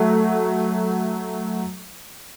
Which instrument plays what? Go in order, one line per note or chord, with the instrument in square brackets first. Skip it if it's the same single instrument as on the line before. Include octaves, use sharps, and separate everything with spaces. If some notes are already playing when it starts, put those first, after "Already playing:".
Already playing: [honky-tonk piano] F#3 A3